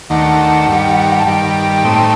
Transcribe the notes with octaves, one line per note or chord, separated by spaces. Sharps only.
D#2 D#3 A3 D4 F#5
G2 D#3 G3
A5
G2 D#3 G3 G5
A2 A3 C4 D#4